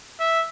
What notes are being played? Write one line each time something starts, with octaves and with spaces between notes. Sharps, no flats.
E5